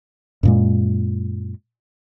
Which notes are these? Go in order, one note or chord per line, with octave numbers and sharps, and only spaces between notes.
F#2 A#2 G#3